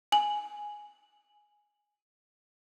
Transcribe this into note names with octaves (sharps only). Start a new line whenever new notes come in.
G#5 F#7